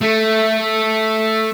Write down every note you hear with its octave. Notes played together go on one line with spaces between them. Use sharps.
A3